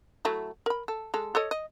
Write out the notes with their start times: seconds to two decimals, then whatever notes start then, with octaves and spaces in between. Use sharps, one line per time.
0.25 F#3 A3 E4
0.66 A#4 B5
0.88 A4
1.14 G#3 A4
1.35 A4 C#5 D#5
1.51 D#5